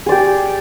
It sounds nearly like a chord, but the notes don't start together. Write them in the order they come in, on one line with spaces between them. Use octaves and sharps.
G#4 D5 G4